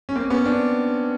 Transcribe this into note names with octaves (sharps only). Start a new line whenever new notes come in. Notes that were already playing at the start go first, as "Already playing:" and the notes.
C#4
A#3 C4
B3 C#4
C4 D4